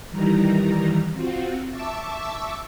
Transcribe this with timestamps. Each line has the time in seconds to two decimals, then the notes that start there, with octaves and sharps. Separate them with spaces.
0.10 D#3 E3 G3 A#5
1.12 C4 F4 F#4
1.71 E5 A5 C#6 D6 E6